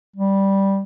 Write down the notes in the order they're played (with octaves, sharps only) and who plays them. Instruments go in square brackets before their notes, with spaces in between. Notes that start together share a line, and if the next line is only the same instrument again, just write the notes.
[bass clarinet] G3